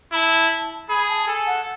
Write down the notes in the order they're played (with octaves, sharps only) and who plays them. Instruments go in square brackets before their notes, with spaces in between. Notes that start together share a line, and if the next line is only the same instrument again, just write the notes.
[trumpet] E4 [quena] B5
[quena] A5
[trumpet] G#4 [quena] B5
[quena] A5
[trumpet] A4 [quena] G#5
[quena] F#5